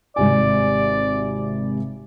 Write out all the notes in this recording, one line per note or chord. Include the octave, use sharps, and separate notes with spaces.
G#1 C3 D5 G#5